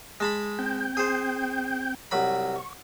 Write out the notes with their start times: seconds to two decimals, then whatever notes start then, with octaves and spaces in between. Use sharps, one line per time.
0.20 G#3 A5 B5
0.59 C4 G5 G6
0.97 G#4 C5
2.11 C2 F#3 B5
2.55 C#6